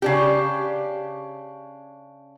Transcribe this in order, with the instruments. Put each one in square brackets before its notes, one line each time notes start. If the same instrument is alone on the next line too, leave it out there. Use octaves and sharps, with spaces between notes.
[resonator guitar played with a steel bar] C#3 D4 G4